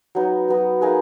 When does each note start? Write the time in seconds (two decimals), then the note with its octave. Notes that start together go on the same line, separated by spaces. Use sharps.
0.15 F#3 B3 D#4
0.48 F#3 B3 D#4
0.81 A#3 D#4 G#4 B4